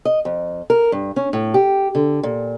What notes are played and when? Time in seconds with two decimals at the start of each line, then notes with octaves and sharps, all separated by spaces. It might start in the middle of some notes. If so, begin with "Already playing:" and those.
0.05 D#5
0.25 F2
0.70 A#4
0.92 G2
1.16 C#4
1.33 A2
1.54 G4
1.95 D3
2.23 A#2